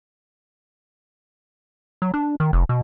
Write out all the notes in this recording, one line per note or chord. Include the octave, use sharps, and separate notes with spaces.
F#3
D4
D#3
F1
B2